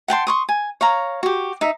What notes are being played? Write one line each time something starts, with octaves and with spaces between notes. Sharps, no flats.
F#5 G5 A5 C6
C6 C#6 D#6
G#5
C#5 F5 A#5
F#4 G4
D#4 E5